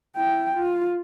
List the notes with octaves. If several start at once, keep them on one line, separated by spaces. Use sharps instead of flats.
E4 G5
F4